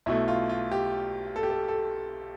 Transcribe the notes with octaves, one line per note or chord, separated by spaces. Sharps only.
B1 B2 A3 E4
F4
F4
G4
A4
G4
A4
A4